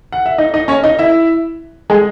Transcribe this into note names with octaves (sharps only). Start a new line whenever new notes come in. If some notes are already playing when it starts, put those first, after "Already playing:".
F#5
E5
D#4 D#5
D#4 D#5
C#4 C#5
D#4 D#5
E4 E5
G#3 G#4